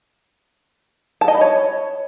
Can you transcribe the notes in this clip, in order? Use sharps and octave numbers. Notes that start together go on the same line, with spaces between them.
A5
D#5
B5
C#5